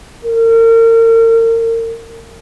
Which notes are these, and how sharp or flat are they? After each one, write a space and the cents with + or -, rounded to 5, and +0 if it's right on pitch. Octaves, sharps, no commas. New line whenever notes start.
A#4 -35